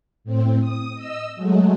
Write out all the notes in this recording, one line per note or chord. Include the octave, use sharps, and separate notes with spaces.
A2 C4
D#6
D#5 E6
F#3 G#3 A3